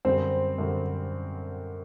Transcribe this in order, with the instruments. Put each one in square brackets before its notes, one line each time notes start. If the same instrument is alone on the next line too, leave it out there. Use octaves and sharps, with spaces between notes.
[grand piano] F#2 D3 G3 [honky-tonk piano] C4
[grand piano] F#2 D3 G3